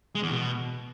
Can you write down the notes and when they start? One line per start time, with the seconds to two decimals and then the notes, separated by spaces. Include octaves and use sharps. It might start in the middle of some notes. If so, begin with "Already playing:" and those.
0.15 G#3
0.23 E2
0.31 B2